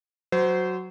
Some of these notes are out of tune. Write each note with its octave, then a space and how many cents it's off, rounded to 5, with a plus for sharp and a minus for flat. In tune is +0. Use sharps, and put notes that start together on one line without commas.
F#3 +0 C5 -20